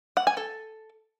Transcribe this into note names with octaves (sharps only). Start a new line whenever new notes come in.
F#5
G#5
A4